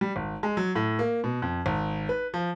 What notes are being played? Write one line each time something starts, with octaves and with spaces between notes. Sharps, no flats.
G3
G#1
G#3
F#3
A2
A#3
B2
F2
G#1
B4
F3